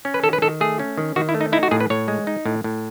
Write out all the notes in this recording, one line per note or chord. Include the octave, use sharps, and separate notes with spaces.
C#4
B4
D#3 A4
B4
D#3 A4
A3 G#4
C#4
D#3
D#3 F#4
E4
A3
D#4
D#4 E4
F#4
A2 G#4
B4
A2 C#5
G#3
D#4
A2
A2